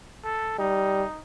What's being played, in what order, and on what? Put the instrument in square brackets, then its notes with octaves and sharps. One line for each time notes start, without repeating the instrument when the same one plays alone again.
[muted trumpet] A4
[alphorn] G3 [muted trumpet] D#4